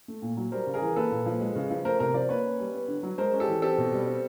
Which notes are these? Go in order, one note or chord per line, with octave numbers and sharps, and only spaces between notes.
A3
A#2
F#3
G3 A#4 C5
C#3
G#4 A#4
E3
A#3 A4 B4
A#2
F3
G#3
C#3
F3
A3 A#4 C5
C3 A#4 C5
F3 C5 D5
A#3 B4 C#5
C#4
G3
B3
D3
F#3
G#3 A#4 C5
C#4
G4 A4
E3
C4 G4 A4
B2
G3
C4